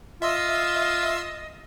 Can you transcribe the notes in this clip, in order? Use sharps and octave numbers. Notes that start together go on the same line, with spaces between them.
F4 D#5 E5 C6 E6